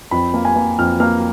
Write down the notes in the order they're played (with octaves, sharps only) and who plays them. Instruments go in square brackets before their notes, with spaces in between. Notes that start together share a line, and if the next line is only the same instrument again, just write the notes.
[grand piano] F2 B5
A#3
G#5
A#3
F2 F6
A#3 F6